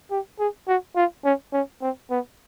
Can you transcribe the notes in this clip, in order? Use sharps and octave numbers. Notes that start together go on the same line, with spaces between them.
G4
G#4
F#4
F4
C#4
C#4
C4
B3